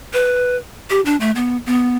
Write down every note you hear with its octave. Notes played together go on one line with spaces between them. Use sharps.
B4
G4
D4
A3
B3
B3